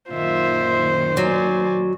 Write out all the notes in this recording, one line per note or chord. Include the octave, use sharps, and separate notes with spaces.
F#2 A#2 D#3 F4 C5 E5
F#3 D5 G#5